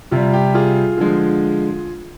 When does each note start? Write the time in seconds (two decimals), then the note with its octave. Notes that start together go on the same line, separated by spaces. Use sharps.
0.11 C3 G3 F4
0.33 G4
0.54 F4 G#4
0.97 D3 F3 G#3